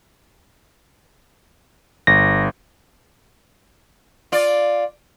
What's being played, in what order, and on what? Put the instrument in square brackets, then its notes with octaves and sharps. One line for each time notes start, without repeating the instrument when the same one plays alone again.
[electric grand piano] G1 [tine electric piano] A#6
[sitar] F4 D5